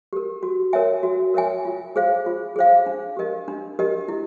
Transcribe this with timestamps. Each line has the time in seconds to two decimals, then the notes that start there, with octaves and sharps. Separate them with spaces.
0.13 G4 A#4
0.43 F#4
0.73 A#4 C#5 E5 G#5
1.03 F#4
1.34 A#4 C#5 E5 G#5
1.65 F4
1.96 G#4 C5 F5
2.26 F4
2.56 G#4 C5 F5
2.86 D4
3.17 G4 A#4 D#5
3.48 D4
3.79 G4 A#4 D#5
4.08 E4